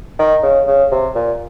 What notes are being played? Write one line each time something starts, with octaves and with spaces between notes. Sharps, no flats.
D#3
C#3
C#3
C3
A#2